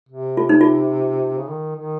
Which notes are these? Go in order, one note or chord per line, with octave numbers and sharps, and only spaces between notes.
C3
F4
D#4
F4
C#3
D#3
D#3